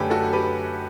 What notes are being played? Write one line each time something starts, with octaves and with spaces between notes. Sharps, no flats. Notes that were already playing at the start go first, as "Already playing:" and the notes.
Already playing: F#2 D3 A3 C#4 G4 B4
F#4 A4
G4 B4